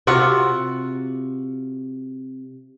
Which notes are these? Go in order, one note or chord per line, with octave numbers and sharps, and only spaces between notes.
C3 F4 F#4 F#5